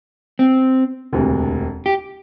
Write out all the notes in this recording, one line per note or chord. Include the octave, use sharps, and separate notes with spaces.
C4
E1 D2 C3
G4